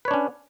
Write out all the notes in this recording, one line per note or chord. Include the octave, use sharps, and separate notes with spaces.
C#4 D4 B4 C#5